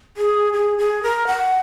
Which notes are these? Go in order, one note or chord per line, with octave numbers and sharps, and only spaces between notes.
G#4
G#4
G#4
A#4
F#5